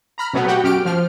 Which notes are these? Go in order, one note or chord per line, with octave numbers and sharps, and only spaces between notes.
A#5 B5 F6
B2 F#3 A3 B3
F#4 G4 F#5 G5
F#2 G4 F6 D7
F3 F6